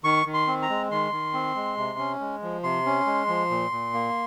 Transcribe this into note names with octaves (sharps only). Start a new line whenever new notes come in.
D#3 C#6
D#3
C6
C4
A#5
G#3
D#3 C6
D#3
C4
G#3
C3
C#4
G#3
F3
C3 C6
C#4
G#3
F3
A#2
A#2
A#3